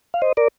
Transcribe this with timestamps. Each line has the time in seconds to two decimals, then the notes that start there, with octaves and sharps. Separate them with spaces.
0.14 F5
0.22 C5 D#5
0.37 A#4 D5